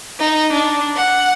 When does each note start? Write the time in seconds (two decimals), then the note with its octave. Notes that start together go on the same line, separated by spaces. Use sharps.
0.20 D#4
0.52 D4
0.95 F#5